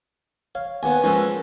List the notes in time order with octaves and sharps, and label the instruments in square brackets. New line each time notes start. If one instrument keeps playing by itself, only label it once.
[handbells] C#5 [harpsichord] F5
[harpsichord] D#2 B3 [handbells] B4 F#5 G#5
[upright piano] F3 A#3 E6 [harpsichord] G#3 C#4